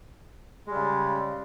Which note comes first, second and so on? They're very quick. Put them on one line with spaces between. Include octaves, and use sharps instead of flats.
G#3 G3 C#3